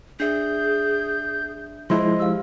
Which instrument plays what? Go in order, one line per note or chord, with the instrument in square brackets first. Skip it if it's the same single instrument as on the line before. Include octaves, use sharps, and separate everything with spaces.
[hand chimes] D4 E5 [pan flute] G#4 [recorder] G6
[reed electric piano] F3 G#3 E4 [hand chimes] C5 C6 [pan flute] D#5
[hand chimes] G4 F5 [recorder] E6